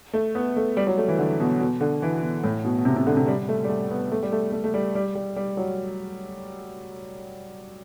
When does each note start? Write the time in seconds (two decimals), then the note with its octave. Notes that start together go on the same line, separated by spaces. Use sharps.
0.13 A3
0.35 B3
0.56 A3
0.77 G3
0.87 F#3
0.98 A3
1.08 E3
1.19 D3
1.40 B2
1.60 B2
1.81 D3
2.02 E3
2.22 B2
2.44 A2
2.65 B2
2.78 B2
2.85 C3
2.96 C3
3.07 D3
3.17 C3
3.27 G3
3.49 A3
3.64 G3
3.69 A3
3.91 B3
4.12 A3
4.23 G3
4.32 A3
4.52 A3
4.64 A3
4.74 G3
4.95 G3
5.15 G3
5.36 G3
5.57 F#3